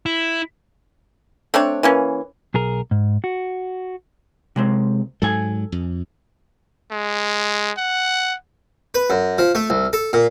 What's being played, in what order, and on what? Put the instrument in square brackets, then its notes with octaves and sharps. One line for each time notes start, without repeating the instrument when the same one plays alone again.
[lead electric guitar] E4
[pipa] A3 C4 D4 C#5
E3 A#3 C#4
[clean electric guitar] B1 G#4 A#4
G#2
F#4
[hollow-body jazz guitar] C3 G#3 C4
[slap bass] G#2 F#3 [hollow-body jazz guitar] A4 G#5
[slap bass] F2
[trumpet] G#3
F#5
[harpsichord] B4
F#2
F3
A3
C2
A4
A#2